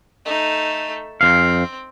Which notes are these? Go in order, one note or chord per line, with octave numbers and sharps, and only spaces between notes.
A3 D#4
F2 C4 F5